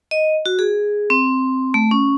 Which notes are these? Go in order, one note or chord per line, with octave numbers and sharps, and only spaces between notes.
D#5
F#4
G#4
C4
A3
C#4